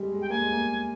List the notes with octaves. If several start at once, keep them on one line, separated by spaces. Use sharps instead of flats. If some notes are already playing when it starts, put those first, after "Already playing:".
Already playing: G3 G#3
G#3
G5
A#3 G#5
G#3
A#3